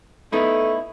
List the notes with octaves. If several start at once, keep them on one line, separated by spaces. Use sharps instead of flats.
A3 B3 D#4 E4